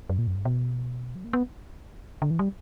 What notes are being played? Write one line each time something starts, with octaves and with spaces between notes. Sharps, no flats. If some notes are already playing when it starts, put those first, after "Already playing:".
F#2
A#2
F#2
G2
B2
F#3
A#3
B3
D3
E3
G3